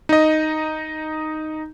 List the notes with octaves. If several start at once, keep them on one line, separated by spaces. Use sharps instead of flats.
D#4 D#5